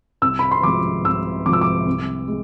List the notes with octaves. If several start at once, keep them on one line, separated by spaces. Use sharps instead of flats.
C2 E6
B5
C6
C3 F3 G#3 D6
C2 E6
C3 F3 G#3 D6
E6
D6
C2
G#3